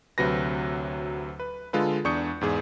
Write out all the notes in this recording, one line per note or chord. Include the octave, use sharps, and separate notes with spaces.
D2 C3 F#3 B4 A#6
B4
D3 G#3 F4 A4 B4
E2 D4 C#6 D#6 G6 C#7
E2 G#2 G#4